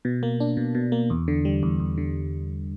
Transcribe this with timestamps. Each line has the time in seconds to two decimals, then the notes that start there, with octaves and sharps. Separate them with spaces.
0.05 B2
0.23 A#3
0.40 D4
0.57 B2
0.75 B2
0.92 A#3
1.10 E2
1.28 D3
1.45 G3
1.63 E2
1.80 E2
1.98 D3